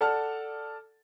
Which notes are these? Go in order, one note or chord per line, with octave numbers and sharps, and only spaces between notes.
A4 D5 F#5 A5 F6